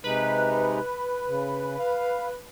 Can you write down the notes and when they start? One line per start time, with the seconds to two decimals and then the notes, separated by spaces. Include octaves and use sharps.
0.04 C3 G#3 D#4 B4
1.27 C#3
1.79 F5